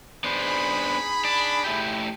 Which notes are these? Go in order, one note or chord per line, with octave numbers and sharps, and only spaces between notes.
B3 D4 D#4 G#4 C5 B5
D4
A3 E4 G4